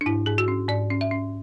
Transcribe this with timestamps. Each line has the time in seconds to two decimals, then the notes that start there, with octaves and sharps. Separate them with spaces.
0.01 D4
0.06 G#2 E4
0.26 G#2 G#4
0.38 F#4
0.48 C#4
0.69 G#2 D5
0.90 C#4
1.01 E5
1.11 C#4